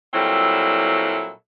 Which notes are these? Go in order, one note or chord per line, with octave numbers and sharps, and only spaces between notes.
A#2 F#3 G3 C4 E4 A4